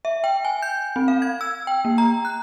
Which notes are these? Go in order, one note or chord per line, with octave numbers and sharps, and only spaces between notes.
E5
G5
G#5
G6
C4
F5
G#6
E6
G5
A#3
A#5
F#6